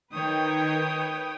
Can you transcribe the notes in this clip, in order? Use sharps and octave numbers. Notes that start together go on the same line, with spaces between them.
D#3 B4 C#5 G5 D#6